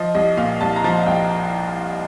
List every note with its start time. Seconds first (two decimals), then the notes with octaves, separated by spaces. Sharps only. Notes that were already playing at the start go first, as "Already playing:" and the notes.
Already playing: F3 D#5
0.15 C2 D#5
0.37 A#2 F5
0.60 C2 A5
0.76 A#5
0.84 F3 A5
1.06 C2 G5